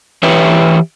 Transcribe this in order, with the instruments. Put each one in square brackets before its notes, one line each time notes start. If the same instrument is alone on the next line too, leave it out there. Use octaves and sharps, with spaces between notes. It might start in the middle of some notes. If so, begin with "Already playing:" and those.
[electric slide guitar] E3 G4 B4 C#5 E5 G5